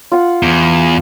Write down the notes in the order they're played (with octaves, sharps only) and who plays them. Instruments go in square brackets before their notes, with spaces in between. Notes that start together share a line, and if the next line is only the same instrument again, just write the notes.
[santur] F4 F#5
[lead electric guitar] E2